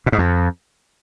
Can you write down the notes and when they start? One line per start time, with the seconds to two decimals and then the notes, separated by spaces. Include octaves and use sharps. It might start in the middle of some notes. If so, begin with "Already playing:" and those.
0.06 B2
0.12 G#2
0.18 F2